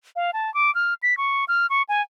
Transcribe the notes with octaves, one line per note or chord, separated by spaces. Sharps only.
F5
A5
D6
F6
B6
C#6
F6
C#6
G#5